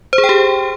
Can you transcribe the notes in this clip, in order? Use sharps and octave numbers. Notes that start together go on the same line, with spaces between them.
C5
G#4
G5
G4